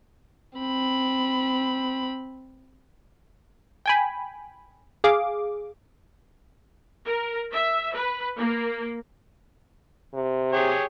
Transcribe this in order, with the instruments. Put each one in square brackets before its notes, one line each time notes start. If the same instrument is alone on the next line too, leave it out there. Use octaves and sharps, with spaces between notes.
[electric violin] C4 B5
[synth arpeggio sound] G5 G#5 B5
G#4 F5 D6
[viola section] A#4
E5
B4
A#3
[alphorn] C3
[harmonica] G4 G#4 C#5